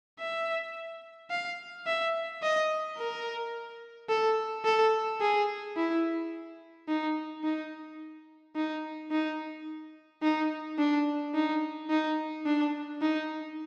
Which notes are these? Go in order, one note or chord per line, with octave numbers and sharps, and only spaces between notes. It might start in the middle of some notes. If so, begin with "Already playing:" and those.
E5
F5
E5
D#5
A#4
A4
A4
G#4
E4
D#4
D#4
D#4
D#4
D#4
D4
D#4
D#4
D4
D#4